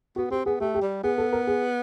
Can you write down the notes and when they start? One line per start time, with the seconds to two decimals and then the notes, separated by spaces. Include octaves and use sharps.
0.16 B3 F#4
0.31 C4 G4
0.46 B3 G#4
0.60 A3 G4
0.75 G4
0.82 G3
1.04 B3 G#4
1.18 A4
1.33 A#4
1.47 G#4